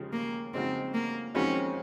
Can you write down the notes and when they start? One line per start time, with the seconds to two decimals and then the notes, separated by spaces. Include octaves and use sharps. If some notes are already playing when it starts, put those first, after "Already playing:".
Already playing: D#2 C#3 F3 G#3
0.13 A#3
0.54 F2 C#3 G#3 C4 D#4 F#4
0.94 A#3
1.34 F2 D#3 G#3 C4 C#4 F#4